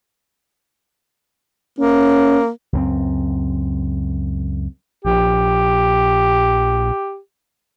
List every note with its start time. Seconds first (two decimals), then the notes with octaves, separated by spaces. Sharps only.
1.79 A#3 C#4
2.73 C#2 F#2 C4
5.05 A#1 G4